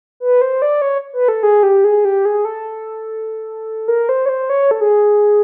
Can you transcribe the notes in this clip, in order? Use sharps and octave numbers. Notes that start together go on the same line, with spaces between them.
B4
C5
D5
C#5
B4
A4
G#4
G4
G#4
G4
G#4
A4
A#4
C5
C#5
C5
C#5
A4
G#4